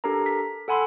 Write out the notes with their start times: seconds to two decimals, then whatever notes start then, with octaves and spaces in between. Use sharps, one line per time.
0.04 D4 G4 A4 A#4 A#5
0.26 B6
0.68 A4 F#5 G#5 B5 C6 E6